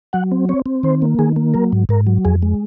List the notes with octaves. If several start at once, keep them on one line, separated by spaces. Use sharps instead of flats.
F#3 F#5
C4
C4 C#5
C4
D#3 C5
A#3
D#3 G#4
A#3
F#3 A#4
G#2
G#2 A#4
F#3
F2 G#4
G#3